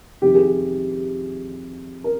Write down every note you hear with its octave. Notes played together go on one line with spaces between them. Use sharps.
F2 C3 D#3 G4
G#4
G4
A#4